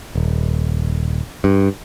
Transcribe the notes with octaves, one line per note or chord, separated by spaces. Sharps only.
D#1
G2